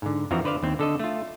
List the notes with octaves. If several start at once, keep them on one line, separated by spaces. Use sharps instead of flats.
G#2 D3
F2 E3 F3 C4 F#4 A#5
D3 B4 C5 D5 F5
D#2 C4
D3 A4 D#5
A3 F4